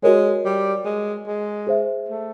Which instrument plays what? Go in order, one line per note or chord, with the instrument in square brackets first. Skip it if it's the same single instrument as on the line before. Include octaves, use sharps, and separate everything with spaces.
[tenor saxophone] G#3 [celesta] F#4 A#4 C#5
[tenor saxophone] G3
G#3
G#3
[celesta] G#4 C5 E5
[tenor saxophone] A3